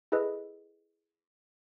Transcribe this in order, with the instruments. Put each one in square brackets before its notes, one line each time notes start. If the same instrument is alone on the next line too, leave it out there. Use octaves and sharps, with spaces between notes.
[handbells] E4 G#4 A4 B4 D#5